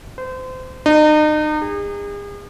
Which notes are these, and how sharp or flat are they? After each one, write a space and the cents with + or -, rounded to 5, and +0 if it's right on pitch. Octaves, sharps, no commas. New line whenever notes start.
C5 -30
D#4 -35
G#4 -40